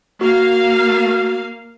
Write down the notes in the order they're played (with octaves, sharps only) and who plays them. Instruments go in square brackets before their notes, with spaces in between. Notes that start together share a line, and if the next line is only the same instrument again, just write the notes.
[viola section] A#3 F5 [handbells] F#4